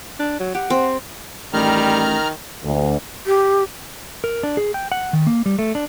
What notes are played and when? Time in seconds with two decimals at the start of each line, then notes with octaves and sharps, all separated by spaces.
0.20 D4
0.40 F#3
0.55 G4 F#5
0.70 C4
1.54 A1 D#3 G3 A#5 F6
2.63 D2
3.27 G4
4.24 A#4
4.43 D4
4.57 G#4
4.74 G5
4.92 F#5
5.13 D#3
5.27 A#3
5.46 G3
5.59 A3
5.75 D4